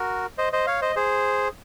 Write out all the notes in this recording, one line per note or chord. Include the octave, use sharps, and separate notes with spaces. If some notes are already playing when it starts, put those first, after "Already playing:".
Already playing: F#4 A#4
C5 D#5
C5 D#5
C#5 F5
C5 D#5
G#4 C5